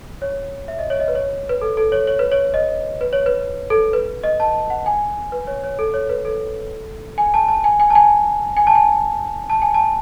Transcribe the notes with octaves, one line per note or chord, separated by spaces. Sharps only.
C#5
E5
D#5
C#5
D#5
B4
C#5
B4
A4
A4
C#5
C#5
B4
C#5
D#5
B4
C#5
B4
A4
B4
D#5
A5
F#5
G#5
B4
C#5
C#5
A4
C#5
B4
A4
G#5
A5
A5
G#5
G#5
A5
G#5
G#5
A5
G#5
A5
G#5
A5